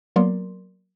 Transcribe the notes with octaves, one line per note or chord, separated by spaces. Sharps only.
F#3 A#3 B3 A#4 D5 C6